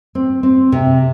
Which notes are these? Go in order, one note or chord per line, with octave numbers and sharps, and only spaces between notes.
C4
C4
C3